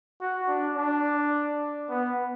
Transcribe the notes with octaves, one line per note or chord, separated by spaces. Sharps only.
F#4
D4
D4
B3